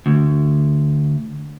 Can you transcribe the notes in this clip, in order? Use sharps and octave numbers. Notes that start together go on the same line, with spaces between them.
D2